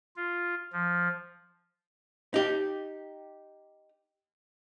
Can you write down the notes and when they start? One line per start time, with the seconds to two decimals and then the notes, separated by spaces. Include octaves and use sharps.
0.16 F4
0.73 F3
2.34 D#4 G4